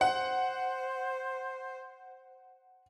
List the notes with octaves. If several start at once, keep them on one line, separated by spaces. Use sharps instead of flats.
C5 F#5